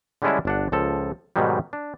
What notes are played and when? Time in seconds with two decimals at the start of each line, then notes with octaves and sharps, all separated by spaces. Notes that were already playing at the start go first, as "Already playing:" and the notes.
0.22 D3 G3 G#3 C#4 D4 E4
0.45 G1 D4 F#5
0.72 C#2 F3 A4
1.36 G#2 B2 D#3 F#3 G3
1.73 D4